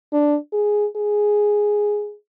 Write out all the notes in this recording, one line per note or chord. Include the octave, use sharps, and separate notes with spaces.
D4
G#4
G#4